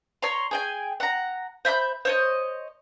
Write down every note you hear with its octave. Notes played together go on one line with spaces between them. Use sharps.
C#5 A#5 C6
G#4 G5 G#5
F#5 A#5
C5 E5 B5 G6
C5 C#5 D#5